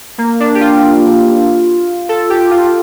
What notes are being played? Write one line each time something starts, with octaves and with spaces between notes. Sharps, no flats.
A#3
D4
G4
F4
A4
G4
F4